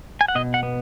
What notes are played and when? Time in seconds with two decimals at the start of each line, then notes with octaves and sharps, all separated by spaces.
0.21 G#5
0.28 F#5
0.35 B2 D#5
0.54 F#5
0.63 B3